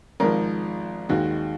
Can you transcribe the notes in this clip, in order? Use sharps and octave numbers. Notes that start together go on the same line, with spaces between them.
G#1 G#2 F3 A#4
D#2 D#3 G#3 F#4